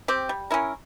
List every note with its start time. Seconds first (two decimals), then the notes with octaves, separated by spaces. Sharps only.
0.08 C4 G4
0.29 G3
0.51 C#4 E4 A#4